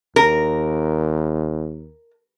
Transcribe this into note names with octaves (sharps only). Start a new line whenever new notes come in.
D#2 A#4